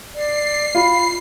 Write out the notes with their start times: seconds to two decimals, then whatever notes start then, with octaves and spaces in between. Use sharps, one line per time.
0.14 D5 C7
0.75 F4 B5